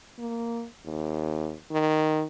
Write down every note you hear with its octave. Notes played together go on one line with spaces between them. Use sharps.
A#3
D#2
D#3